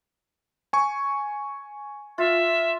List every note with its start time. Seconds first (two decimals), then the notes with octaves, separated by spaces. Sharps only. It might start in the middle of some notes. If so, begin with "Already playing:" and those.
0.73 G#5 C#6
2.18 F4 E5